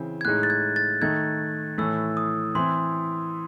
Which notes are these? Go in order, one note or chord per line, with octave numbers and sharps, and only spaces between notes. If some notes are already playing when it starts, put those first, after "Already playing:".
Already playing: C#3 E3 C4
G#6
A2 G#3 D#4 F#6
A6
G#6
A6
D#3 A3 D#4 G#6
A2 E3 A3 E6
D#6
E3 C4 E4 C6